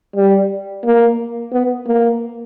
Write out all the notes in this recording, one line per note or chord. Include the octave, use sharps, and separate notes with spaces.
G3
A#3
B3
A#3